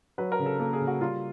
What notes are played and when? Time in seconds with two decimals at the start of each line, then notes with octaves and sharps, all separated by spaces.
0.18 F#3 B4
0.32 A#4
0.39 C#3
0.46 A4
0.60 A#3 A4
0.73 G#4
0.81 C#3
0.87 F#4
1.01 G3 F4